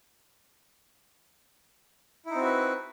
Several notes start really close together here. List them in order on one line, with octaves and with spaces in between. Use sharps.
E4 D#4 C4 F#4 B4